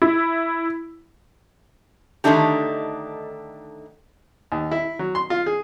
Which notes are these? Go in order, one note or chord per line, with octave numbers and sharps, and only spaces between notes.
E4
D3 D#3 A3 D4 D#4 G4
D#2
E4
F#3
C6
F4
G#4